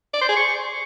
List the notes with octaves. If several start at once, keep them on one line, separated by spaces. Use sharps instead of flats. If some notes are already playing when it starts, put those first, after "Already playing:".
D5
C5
G#4
C#6